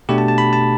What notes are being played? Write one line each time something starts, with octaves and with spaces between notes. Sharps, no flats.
B2 A3 D4 G4
A5
A5
B5
A5